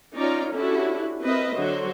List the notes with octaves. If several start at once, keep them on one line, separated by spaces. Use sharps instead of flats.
C#4 D#4 F4 D5 A#5
C#4 D4 E4 F#4 G4 A4
C4 A#4 B4 D#5 E5
D3 F#3 F#4 C5